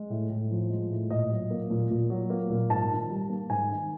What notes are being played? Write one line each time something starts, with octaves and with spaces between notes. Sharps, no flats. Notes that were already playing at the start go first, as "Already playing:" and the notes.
Already playing: G#3
A2
A2
F3
G#3
A2
A#2 D#5
F#3
A#3
A#2
A#2
F#3
A#3
A#2
G#2 A5
D#3
G3
A#3
G#2 G#5
D#3